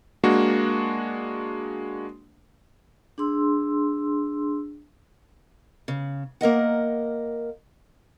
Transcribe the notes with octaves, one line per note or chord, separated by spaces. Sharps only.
G#3 A#3 D4 F#4
D4 G#4 C6 E6
C#3
A#3 A#4 D#5 F#5